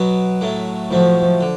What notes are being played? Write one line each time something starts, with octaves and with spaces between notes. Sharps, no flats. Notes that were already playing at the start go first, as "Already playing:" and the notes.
Already playing: B2 F#3 B3
A2 F#3 A3
A2 F3 F#3 A3
D3